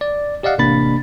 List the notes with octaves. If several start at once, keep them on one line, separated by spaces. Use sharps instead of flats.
D5
G4 D5 D#5 F5 F#5
A1 C3 A#3 D4 B5 A6